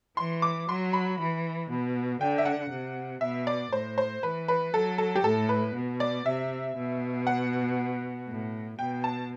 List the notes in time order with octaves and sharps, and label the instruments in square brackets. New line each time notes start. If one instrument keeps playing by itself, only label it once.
[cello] E3 [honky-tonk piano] C6
[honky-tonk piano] D6
[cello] F#3 [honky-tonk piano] C6
[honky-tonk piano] B5
[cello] E3
B2
[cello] D3 [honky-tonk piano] G5
[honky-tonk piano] E5
F#5
[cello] C3
[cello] B2 [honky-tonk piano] E5
[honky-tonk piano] D5
[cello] A2 [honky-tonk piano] C5
[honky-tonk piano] C5
[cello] E3 [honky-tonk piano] B4
[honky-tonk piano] B4
[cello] F#3 [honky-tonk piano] A4
[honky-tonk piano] A4
G4
[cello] A2 [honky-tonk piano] A4
[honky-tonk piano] B4
[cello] B2
[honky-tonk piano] D5
[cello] C3 [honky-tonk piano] E5
[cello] B2
[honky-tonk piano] F#5
[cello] A2
[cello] B2 [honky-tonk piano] G5
[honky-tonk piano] A5